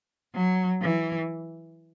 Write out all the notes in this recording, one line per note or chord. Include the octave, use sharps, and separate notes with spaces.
F#3
E3